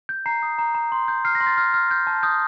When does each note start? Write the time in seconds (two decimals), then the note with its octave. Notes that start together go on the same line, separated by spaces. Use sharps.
0.09 G6
0.26 A#5 C7
0.43 D#6
0.58 A#5
0.75 A#5
0.92 C6
1.08 G6
1.25 F6 C7
1.35 A#6
1.40 C6
1.47 A6
1.57 F6
1.74 F6
1.91 G6
2.07 A5
2.23 D#6 G6